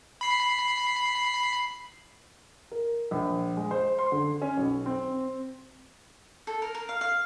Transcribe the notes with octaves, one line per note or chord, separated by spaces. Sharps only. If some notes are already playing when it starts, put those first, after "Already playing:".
B5 C7
A#4
A#1
G#3
C5
C6
D3
C#4
B1
C4
A4
A#4
A#4
F5
F5